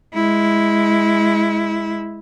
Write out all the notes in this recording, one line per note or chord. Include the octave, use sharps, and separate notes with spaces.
G#3 E4